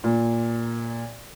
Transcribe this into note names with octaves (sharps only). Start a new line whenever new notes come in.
A#2